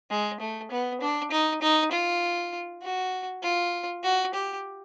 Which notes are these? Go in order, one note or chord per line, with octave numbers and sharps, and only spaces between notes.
G#3
A3
B3
D4
D#4
D#4
F4
F#4
F4
F#4
G4